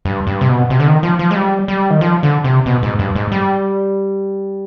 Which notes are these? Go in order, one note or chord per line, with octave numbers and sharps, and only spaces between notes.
G2
G2
C3
B2
C3
D3
D#3
F3
F3
G#3
G3
G3
D#3
F3
D3
C3
B2
G#2
G2
G#2
G3